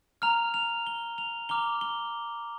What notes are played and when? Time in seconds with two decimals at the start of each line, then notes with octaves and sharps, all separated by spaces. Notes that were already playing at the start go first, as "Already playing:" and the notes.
0.22 A#5 F6 F7
0.54 F7
0.87 G7
1.18 F7
1.49 A#5 D6 F6 G7
1.81 G7